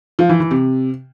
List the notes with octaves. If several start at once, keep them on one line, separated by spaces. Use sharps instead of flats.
F3
E3
E3
C3